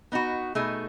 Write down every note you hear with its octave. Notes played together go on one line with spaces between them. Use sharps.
B3 D#4 F#4
B2 A3 D#4 G#4